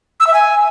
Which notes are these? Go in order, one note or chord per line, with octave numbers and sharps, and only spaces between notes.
E6
E5
G#5